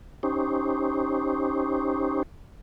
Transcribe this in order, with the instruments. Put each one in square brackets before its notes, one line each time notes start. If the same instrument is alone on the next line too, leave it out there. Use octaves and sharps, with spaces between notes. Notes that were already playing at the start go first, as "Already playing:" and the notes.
[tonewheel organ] C#4 D#4 G4 C5